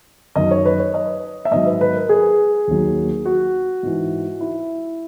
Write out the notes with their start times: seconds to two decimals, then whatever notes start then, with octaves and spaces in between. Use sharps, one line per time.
0.36 F#2 D#3 F#3 D#5
0.51 C#5
0.65 B4
0.79 C#5
0.94 D#5
1.45 E5
1.51 G#2 D#3 F#3 D#5
1.66 B4
1.81 B4
1.95 A#4
2.09 G#4
2.68 D#2 D#3 F#3
3.25 F#4
3.83 G#2 E3
4.40 E4